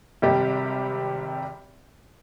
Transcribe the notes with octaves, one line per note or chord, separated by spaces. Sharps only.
G#1 C3 G3 G4